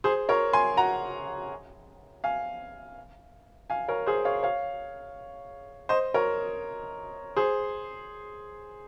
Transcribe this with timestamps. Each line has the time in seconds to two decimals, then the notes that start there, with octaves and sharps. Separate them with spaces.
0.04 G#4 C5
0.29 A#4 C#5
0.53 G#5 C6
0.77 F#5 A#5
2.24 F5 G#5
3.70 F5 G#5
3.88 A#4 C#5
4.06 G#4 C5
4.25 C#5 F5
4.43 C#5 F5
5.89 C5 D#5
6.14 A#4 C#5
7.36 G#4 C5